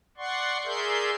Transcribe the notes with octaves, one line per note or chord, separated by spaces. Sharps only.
D5 F#5 C6 C#6
G#4 A#4 D5 E5 C6 G6